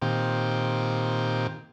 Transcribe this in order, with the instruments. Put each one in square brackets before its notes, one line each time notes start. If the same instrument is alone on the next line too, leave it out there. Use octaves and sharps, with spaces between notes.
[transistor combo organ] A#2 D#3 C4 G4